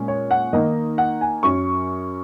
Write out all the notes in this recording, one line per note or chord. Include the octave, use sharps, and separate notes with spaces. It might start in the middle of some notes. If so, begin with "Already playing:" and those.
Already playing: A#2 G#3 C#4
C#5
F#5
D#3 A#3 D#4 D#5
F#5
G#5
F#2 F#3 C#4 C#6